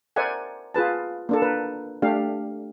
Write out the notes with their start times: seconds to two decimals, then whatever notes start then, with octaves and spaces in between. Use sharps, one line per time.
0.16 A#4 C5 D5 E5 F#5 G#5
0.74 F4 G#4 B4 A5
1.29 A#3 D4 A4
1.42 A#4 B4
2.02 A3 D4 G4 F5